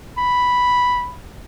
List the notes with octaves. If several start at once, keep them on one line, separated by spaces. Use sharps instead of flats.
B5